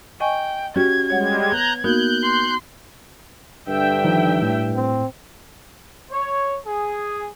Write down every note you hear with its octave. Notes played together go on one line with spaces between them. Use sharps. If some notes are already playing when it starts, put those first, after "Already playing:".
D#5 G5 G#5 C#6
C#4 F#4 G4 G#6
G3 G#3 C#5 F#5
B3 A#5 F#6 G6
A#3 B3 D#4 F#4 F#6 G6
C6
G2 D3 E5 G5
D#3 F3 D#4
A2
C4
C#5
G#4